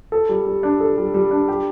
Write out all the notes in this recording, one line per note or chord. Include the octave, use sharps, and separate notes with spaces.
A4
G3
G3
D4
A4
G3
G3
D4
G4